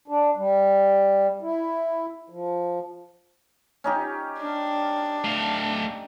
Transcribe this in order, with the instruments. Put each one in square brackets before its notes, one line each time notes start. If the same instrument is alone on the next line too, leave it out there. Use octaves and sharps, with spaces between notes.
[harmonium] D4
G3
E4
F3
[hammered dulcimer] C#4 D#4 G4
[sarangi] D4
[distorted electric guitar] A3 F5